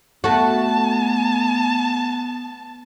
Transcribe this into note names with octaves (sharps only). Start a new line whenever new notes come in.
A3 B3 F#4 A5